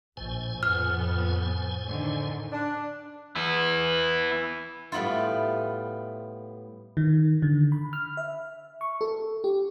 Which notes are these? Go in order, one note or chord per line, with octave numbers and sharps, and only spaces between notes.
A#1 A2 C5 G#5
F2 B3 F6
D3 D#3
D4
B3 E4
A2 G3 B3 E4 F4
D#3
D3
B5
F6
E5
C#6
A4
G4